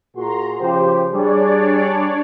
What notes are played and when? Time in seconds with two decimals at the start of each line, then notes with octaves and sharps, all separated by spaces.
0.16 A#2 F#4 G#4 A#5 C6
0.60 C#3 F3 G4 C5
1.12 G3 D4 G#4 C#5 D5